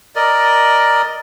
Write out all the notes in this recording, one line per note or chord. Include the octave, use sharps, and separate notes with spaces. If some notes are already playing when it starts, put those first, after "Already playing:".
A#4 D5 D#5